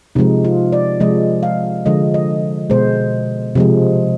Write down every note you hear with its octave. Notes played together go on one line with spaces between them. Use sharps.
C3 F3 G#3 D#4
F4
D5
C3 F3 G#3 D#5
F5
D3 F3 G#3 D#5
D#5
B2 G#3 C5
C3 F3 G#3